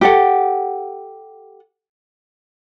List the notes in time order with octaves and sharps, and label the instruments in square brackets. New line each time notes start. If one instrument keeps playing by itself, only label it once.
[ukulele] G4 A4 F#5